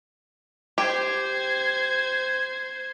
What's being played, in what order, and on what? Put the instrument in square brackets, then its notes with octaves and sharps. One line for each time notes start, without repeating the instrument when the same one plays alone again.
[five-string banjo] G4 [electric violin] C5 G#6